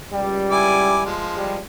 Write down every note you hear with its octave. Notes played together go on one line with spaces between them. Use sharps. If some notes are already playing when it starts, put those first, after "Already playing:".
C#2 G3
E4 G#5 D6
F3 G#3
G3